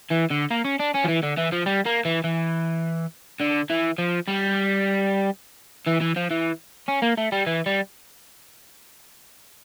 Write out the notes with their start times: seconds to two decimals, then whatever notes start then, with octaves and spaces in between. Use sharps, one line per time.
0.11 E3
0.31 D3
0.51 A#3
0.65 C#4
0.79 D4
0.94 C#4
1.04 F3
1.08 E3
1.23 D3
1.37 E3
1.52 F3
1.66 G3
1.86 A#3
2.05 E3
2.24 E3
3.40 D3
3.70 E3
3.98 F3
4.28 G3
5.87 E3
6.01 E3
6.17 F3
6.31 E3
6.89 C#4
7.02 A#3
7.18 A3
7.32 G3
7.47 E3
7.66 G3